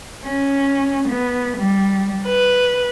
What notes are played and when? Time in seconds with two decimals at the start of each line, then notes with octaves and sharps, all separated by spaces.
0.24 C#4
1.09 B3
1.57 G3
2.27 B4